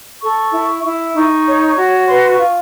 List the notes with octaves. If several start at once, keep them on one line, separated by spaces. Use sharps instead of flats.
A4 C#6
E4
E4
D#4 C#6
C#5
F#4
B4 C6
C#6
F4